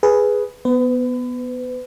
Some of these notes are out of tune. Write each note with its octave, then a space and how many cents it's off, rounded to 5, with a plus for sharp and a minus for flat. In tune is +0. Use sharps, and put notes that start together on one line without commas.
G#4 +0 B4 +0
B3 +0 B4 +35